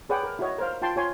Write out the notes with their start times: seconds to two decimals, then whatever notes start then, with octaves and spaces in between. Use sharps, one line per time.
0.09 G#4 B4 C#5 D5 F#5 G5
0.23 A#4
0.39 E4 F#4 C#5 D#5
0.58 A#4 C5 F5
0.82 F4 G5 A5 C6
0.96 F4 C#5 G#5 C6